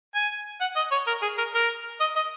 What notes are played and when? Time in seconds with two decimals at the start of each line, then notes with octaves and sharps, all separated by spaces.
0.15 G#5
0.61 F#5
0.76 D#5
0.91 C#5
1.07 A#4
1.22 G#4
1.38 A#4
1.54 A#4
2.00 D#5
2.16 D#5